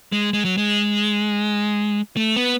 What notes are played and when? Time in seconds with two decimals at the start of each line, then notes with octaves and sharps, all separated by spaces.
0.12 G#3
0.33 G#3
0.45 F#3
0.58 G#3
2.17 A3
2.36 B3